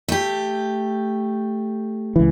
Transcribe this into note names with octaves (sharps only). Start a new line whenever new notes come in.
A3 G4
C#2 E3